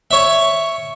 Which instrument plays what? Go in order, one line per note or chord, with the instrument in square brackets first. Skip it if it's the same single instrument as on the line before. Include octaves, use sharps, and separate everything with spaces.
[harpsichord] C#5 E5